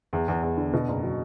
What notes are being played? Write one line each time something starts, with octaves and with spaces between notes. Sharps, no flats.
E2
E2
E2
D3
B2
F#1
F#3